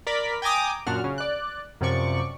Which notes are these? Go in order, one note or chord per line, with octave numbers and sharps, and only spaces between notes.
A#4 D5 B5 B6
G5 G#5 A#5 D6 D#6
F#2 A#2 D4 F#4 F6
C#3
D5 F#6
F#2 C3 F3 D5 C#6